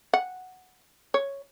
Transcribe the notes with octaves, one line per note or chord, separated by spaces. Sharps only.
F#5
C#5